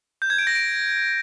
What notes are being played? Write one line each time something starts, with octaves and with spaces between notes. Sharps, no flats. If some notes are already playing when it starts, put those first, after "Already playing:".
G6
G#6
D7
A#6
D7